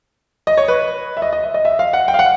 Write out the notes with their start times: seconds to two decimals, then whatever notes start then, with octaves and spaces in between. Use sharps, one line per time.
0.47 D#5
0.57 C#5
0.68 B4
1.17 E5
1.22 D#5
1.33 D#5
1.43 E5
1.54 D#5
1.65 E5
1.79 F5
1.93 F#5
2.08 G5
2.14 F5
2.19 F#5